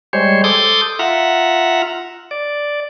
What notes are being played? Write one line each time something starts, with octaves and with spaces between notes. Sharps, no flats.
G3 G#3 C5 C#5
A4 C6 D6 D#6 G6
F4 E5 F#5 A#5
D5